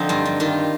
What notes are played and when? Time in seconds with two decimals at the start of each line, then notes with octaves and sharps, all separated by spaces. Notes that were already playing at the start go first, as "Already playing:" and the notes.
Already playing: D3 F3 C4 D#4
0.09 G2 F4
0.25 G2
0.40 D#3 F4